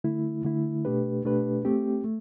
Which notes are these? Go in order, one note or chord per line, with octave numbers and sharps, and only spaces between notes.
D3 A3 E4
D3 A3 E4
B2 A3 D4 G4 B4
B2 A3 D4 G4 B4
A3 C4 G4
A3